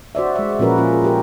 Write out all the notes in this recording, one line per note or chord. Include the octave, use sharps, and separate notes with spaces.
F#4 C5 D5 E5
G#3 E5
A#2 F3 C#4 F#4 A#4 B4
C#4 F4 G#4
A#2 G4 A#4